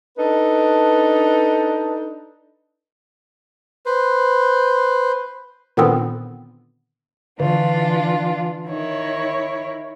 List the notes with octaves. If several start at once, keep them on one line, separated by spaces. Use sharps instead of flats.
D4 D#4 A4 B4
B4 C5
A#2 D3 D#3 B3 C4
D3 E3 D4 F4
D#3 E4 C#5